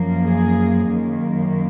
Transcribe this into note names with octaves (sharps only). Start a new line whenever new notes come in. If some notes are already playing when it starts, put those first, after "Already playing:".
Already playing: F#2 F3 A#3
G#4
F#2 D#3 A#3